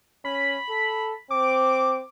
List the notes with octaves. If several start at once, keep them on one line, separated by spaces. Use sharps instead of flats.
C#4 B5
A4
C4 D6